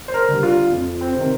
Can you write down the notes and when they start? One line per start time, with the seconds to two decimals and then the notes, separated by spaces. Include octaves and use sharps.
0.08 C5
0.14 A#4
0.28 D3 G3
0.43 F4
0.72 F2
1.01 C4
1.15 C3 D#3